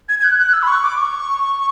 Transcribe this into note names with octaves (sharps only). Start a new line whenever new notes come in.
G#6
G#6
F#6
F#6
E6
B5
C#6
D6
C#6